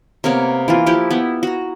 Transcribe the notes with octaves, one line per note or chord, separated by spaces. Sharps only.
C3 A#3 B3 C#5
E3 A#3 F4
F3 E4 G4
B3 E4
F#4 A#5